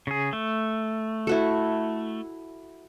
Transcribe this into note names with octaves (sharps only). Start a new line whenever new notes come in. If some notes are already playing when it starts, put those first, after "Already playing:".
C#3 G#4
A3
E4 F#4 A4